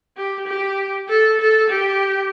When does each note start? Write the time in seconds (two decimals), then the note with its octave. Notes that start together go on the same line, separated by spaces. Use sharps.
0.17 G4
0.47 G4
1.09 A4
1.40 A4
1.70 G4